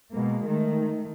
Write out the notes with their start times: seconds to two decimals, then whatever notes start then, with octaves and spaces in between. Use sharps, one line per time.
0.13 B2 G#3 A#3
0.47 D#3 A3